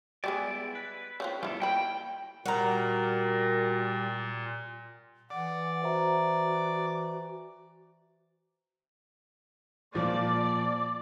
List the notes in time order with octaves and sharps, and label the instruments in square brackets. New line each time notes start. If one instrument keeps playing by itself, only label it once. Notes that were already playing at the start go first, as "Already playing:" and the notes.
[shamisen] G3 G#3 G#4 [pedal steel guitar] B3 E4 D5
[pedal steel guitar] B4
[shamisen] C#3 C4 F4
[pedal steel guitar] G3 B3 A4 [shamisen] E4 F4
[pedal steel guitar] A#3 [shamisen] D#5 B5 [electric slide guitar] G5
[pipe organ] A#2 [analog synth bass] G3 [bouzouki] F#4 A#5 [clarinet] A#4
[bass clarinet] E3 [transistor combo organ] D5 [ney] F#5
[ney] F#4 [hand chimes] C5 E5 A#5
[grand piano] A#2 F3 F4 [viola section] D5